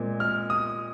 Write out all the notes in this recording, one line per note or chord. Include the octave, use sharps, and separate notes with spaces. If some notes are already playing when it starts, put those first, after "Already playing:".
Already playing: A#2 G#3 C4
F6
D#6